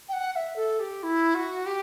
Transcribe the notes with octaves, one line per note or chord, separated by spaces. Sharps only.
G5
F#5
F#5
E5
A4
G4
E4
F#4
G4